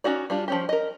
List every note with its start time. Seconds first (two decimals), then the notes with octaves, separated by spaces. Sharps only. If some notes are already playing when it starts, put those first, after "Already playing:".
0.04 C#4 D#4 F#4 D5
0.30 G3 D4 F4
0.48 F3 C#4 G4
0.69 A#4 D#5